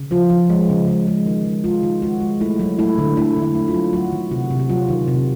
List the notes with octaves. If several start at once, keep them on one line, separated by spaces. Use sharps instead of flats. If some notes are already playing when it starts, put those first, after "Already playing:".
Already playing: C#3
F3 F4
F3
G#3
C#3
G#3
G#3
D#3
G#3
G#3 F4
D#3
G#3 F#4
G#3
A3 E4
F#3
A3 E4
D3
A3 E4
D3
E4
A3
F4
F#3
F#3 F#4
D#3
C3 F#4
C3
F#4
F#3 F4
D#3
C3